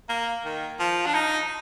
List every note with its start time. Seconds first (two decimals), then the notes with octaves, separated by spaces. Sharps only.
0.09 A#3
0.45 D#3
0.79 F3
1.06 D4
1.14 D#4